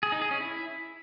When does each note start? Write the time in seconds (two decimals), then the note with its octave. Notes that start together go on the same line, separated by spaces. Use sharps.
0.03 G#4
0.12 D#4
0.22 G#4
0.31 C#4
0.40 E4